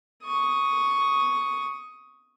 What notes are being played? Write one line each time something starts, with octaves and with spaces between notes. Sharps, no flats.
C#6 D#6